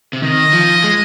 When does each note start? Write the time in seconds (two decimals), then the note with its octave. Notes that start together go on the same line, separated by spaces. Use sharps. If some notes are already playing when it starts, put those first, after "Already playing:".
0.13 C3
0.22 D#3 D#5
0.53 F3
0.84 G#3